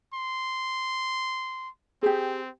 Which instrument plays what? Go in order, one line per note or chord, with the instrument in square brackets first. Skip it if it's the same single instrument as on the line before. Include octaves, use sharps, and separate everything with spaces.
[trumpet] C6
[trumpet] C4 [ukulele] G4 G#4